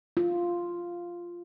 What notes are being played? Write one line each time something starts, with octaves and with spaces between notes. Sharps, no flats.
F4